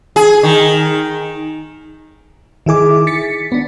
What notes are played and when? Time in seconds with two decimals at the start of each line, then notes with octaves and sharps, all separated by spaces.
0.16 G#4
0.43 D#3
2.66 D#3 E4 G#4 D6
3.07 A6 B6 C#7
3.52 B3 D4